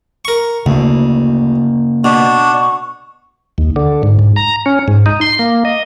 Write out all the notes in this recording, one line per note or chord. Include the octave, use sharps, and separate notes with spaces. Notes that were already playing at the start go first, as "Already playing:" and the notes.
A#4 C#6
D2 C#3 A#3
B2 D4 C#6
D#2
D3
G#2
G#2
A#5
C#4
G#2
D#4
C6
A#3
D#5